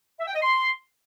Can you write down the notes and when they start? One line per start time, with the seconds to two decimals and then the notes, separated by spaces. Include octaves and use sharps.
0.19 E5
0.27 G5
0.34 D#5
0.42 C6